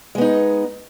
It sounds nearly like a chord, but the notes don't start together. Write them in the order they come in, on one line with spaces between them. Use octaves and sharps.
G#3 B3 D#4